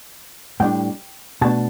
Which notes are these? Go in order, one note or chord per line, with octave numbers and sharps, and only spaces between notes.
A2 G3 D4 G5
B2 A3 D4 A5